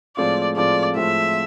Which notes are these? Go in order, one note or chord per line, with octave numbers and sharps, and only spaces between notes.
A2 F3 G#3 C4 F4 D5
A2 F3 G#3 C4 F4 D5
A2 F3 G#3 C4 F4 E5